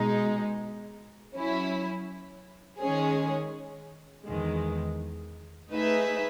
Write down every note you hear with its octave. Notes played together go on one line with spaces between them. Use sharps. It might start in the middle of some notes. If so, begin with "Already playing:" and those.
Already playing: B2 G#3 D#4
F#3 C#4 E4
D#3 G#3 C#4 G#4
E2 D#3 G#3
A3 D#4 G#4 B4 E5